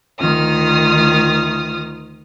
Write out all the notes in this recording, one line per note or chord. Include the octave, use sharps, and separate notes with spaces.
D2 D#3 F4 D#6 F6